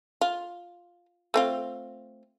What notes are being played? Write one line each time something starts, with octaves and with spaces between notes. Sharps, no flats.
F4
A3 C4 F4